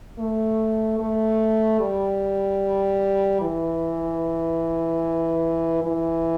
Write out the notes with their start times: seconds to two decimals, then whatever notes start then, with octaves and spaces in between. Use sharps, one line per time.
0.19 A3
0.99 A3
1.80 G3
3.41 E3
5.83 E3